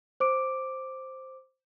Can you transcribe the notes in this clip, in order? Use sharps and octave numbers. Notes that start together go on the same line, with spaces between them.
C5 D6 D7